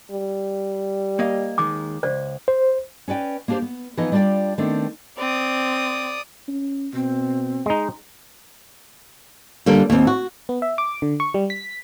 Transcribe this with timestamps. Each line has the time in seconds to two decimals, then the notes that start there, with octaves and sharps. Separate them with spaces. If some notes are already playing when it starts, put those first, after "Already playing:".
0.11 G3
1.19 A#3 D#5 F5
1.58 D#2 D#3 G#3 D6
2.03 C#2 C5 D5
2.48 C5
3.08 C#4 B4 D5 G5
3.48 A#3 B3 D4 G4 C5
3.62 B3
3.97 E3 F3 B3 D#4 D#5
4.12 G3 D4 F4 C5 D5 G5
4.58 D#3 A3 B3 C4 D4
5.18 C4 D5 D#6
6.48 C#4
6.93 B2 C4
7.66 G#3 D#4
9.66 D3 G3 A#3
9.90 D#2 C4
10.07 F#4
10.49 B3
10.62 E5
10.78 D6
11.02 D3
11.20 C#6
11.34 G3
11.50 B6